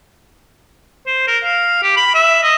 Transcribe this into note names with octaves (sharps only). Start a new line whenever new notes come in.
C5
A#4
F5
G4
B5
E5
D#5